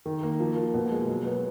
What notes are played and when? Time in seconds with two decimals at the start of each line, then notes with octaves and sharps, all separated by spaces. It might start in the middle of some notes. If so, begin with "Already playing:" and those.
0.06 D#3
0.23 A#3
0.40 F3
0.57 A#3
0.74 B2
0.92 G#3
1.08 F#3
1.26 B3